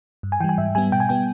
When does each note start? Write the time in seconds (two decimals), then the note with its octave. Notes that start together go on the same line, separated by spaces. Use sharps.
0.23 G2
0.32 G#5
0.40 E3 G5
0.44 G3
0.49 G#5
0.58 G#2 E5
0.75 G3 B3 G#5
0.92 B2 G5
1.00 G#5
1.09 G3 B3 G5